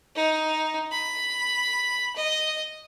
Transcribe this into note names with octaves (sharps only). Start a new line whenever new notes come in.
D#4
B5
D#5